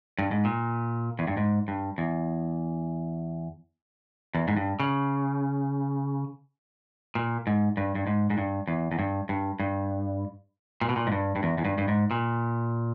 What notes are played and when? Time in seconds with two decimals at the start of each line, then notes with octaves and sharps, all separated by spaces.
0.19 G2
0.31 G#2
0.45 A#2
1.19 E2
1.27 G2
1.37 G#2
1.68 G2
1.98 E2
4.35 E2
4.48 G#2
4.57 G2
4.80 C#3
7.15 A#2
7.47 G#2
7.77 G2
7.95 G2
8.07 G#2
8.30 G#2
8.38 G2
8.67 E2
8.92 E2
8.99 G2
9.29 G2
9.60 G2
10.81 A#2
10.89 B2
10.96 A#2
11.07 G#2
11.12 G2
11.36 G2
11.43 E2
11.58 E2
11.65 G2
11.78 G2
11.88 G#2
12.11 A#2